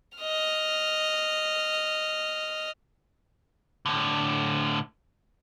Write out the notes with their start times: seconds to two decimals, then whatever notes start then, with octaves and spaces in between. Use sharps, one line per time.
0.18 D#5 F6
3.86 A2 D3